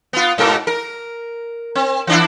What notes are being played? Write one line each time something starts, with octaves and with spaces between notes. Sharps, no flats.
B3 F4
G#2 B2 A#4
A#4
C4
E3 D4 E4